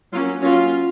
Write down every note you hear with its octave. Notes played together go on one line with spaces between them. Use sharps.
F#3 A#3 C#4 F4
F#3 A#3 C#4 F4